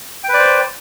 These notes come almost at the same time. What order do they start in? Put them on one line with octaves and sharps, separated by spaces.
G5 B4 D5 C5